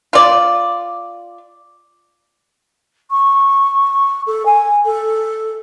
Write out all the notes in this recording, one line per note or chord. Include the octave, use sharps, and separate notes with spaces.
F4 D5
C#6
A4
G#5
A4